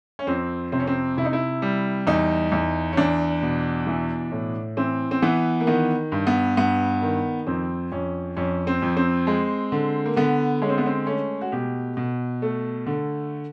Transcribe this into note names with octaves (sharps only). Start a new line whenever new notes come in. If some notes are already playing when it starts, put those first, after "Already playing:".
C#4
F2 C4
C3 C4
C#4
C4
C3 E4
D#4
E4
G3
E2 D#4
E2
C#4
E2 D4
B2
E3
A2
E3 C4
C4
E3 B3
A#3
D#3 B3
G2
B3
G2 B3
D#3
F2 C4
F2 C#4
F2 C#4
C4
F2
C4
G#3
D3
A#3
D3 B3
G#3 C#4
C4
B3
C4
A3 C#4
F#4
B2 G4
B2
A3
D3